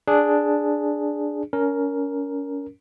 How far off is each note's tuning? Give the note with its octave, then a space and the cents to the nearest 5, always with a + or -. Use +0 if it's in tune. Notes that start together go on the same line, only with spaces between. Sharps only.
D4 +0 G#4 +0
C#4 +30 A#4 +0